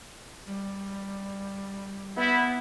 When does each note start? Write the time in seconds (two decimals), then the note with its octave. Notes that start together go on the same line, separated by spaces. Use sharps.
0.46 G3
2.16 B3 E4